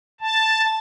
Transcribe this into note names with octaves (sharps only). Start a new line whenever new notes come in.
A5